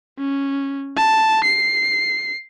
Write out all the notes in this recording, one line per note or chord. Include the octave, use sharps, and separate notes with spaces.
C#4
A5
C7